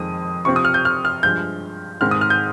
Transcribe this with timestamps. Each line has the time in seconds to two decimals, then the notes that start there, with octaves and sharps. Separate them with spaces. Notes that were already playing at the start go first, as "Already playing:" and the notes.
Already playing: F2 D#3 G#3 C4 D#6
0.45 C3 F3 C4 C#6
0.56 D#6
0.65 F6
0.74 G6
0.85 F6
1.05 F6
1.23 G2 F3 G#3 G6
2.01 G#2 D#3 G#3 C4 F6
2.11 D#6
2.21 F6
2.30 G6